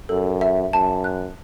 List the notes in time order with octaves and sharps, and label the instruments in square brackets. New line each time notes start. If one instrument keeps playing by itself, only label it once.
[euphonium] F#2 [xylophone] A4
[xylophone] E5
[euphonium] F#2 [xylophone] A5
[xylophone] F#6